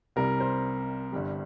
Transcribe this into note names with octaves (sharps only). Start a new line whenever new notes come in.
C2 C3 G3 A#4
C5
G1 G2 G3